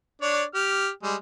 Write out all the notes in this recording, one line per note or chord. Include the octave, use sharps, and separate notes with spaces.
D4 C#5 D5
G4 F6
G3 G#3